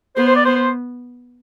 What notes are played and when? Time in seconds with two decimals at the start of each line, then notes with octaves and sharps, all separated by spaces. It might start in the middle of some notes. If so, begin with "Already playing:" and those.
0.16 B3 C5
0.26 C5
0.36 D5
0.46 C5
0.56 C5